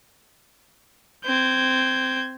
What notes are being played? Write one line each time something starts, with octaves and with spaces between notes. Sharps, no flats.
C4 G6 G#6